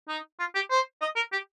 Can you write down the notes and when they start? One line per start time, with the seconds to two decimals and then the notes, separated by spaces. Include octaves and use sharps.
0.08 D#4
0.39 F4
0.55 G4
0.71 C5
1.02 D#5
1.16 A#4
1.33 G4